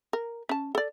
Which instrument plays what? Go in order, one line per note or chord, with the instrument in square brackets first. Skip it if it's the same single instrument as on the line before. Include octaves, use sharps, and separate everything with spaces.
[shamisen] A#4
C#4 A5
A4 D5